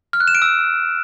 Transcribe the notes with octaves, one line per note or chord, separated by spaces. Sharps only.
F6
F#6
E7
D7
E6